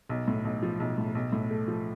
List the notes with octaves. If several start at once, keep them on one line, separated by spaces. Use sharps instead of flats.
B1
A2
B1
F3
B1
A2
B1
A2
A3
F3